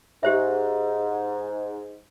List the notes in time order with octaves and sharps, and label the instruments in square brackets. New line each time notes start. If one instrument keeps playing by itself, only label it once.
[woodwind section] G#2 [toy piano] G4 C5 E5